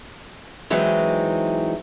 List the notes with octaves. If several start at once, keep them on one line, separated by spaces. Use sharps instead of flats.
E3 F#3 G#3 C4 D#4